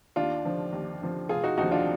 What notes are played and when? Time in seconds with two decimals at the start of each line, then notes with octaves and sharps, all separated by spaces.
0.16 D#2 D4 F4
0.45 D3 F3
0.73 D#2
1.01 D3 F3
1.29 F1 F4 G#4
1.43 D#4 F#4
1.57 D#2 D3 F3 D#4 F#4
1.71 D4 F4